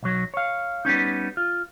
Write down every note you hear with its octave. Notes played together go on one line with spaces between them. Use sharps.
B1 F#3
C#5 F5
G3 B3 C#4 D#4
F4